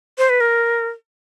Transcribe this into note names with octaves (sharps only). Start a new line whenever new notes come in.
C5
B4
A#4